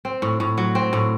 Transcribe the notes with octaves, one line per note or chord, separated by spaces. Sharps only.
C4
A2
A2
F#3
C4
A2